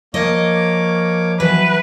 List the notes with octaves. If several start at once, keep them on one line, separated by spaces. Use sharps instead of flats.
F3 A#3 C#5 D#5 D6
E3 F#3 B4